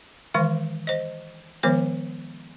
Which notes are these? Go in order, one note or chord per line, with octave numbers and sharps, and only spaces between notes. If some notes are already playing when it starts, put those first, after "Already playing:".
D#3 E3 G#3 C5 F5 C#6
C5 D#5
D#3 F3 G#3 B3 C5 D6